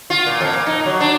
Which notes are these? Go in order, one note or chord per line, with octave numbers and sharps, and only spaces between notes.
F4
A#2
F2
A#2
D#4
F#3
D4